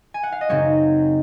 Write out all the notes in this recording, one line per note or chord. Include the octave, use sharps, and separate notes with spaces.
G#5
F#5
F5
D#5
F#2 C#3 G#3 C4 D#4 C#5